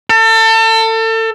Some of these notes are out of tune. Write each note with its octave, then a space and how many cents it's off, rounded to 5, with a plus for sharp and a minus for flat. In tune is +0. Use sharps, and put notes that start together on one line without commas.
A4 +30